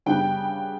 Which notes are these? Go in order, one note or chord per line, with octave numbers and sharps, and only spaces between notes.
C#3 G3 B3 D4 G5